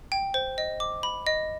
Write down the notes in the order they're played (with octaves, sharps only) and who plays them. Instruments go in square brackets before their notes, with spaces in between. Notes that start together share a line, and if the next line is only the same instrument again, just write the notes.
[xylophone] G5
C5
D#5
D6
B5
D#5